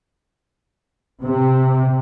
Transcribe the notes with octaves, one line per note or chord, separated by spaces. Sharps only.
C3